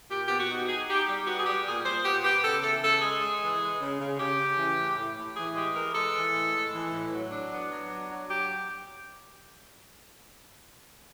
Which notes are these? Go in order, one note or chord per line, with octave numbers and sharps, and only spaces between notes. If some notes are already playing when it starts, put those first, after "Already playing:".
A#2 G4
B3 G4
F#4
D#4
D#4 G#4
D#4 G4
G3 G4
B3 F#4
G#4
G3 G4
A#2 G#4
A#2 C5
B3 G4
B3 G4
C#3 A4
E3 A4
C#3 A4
G#3 G#4
G#3
E3
G#3
C#3
C#3
C#3 G4
C#3
E3
A2
A2
A2
E3 G#4
G#3 G4
E3 A#4
G#3 A4
E3
A2
G#3
E3
A2
F#3
D4
B3
F#3
D4
F#3
F#3 G4